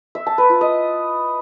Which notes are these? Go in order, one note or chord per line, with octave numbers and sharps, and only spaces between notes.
E5
A5
B4
F4
D#5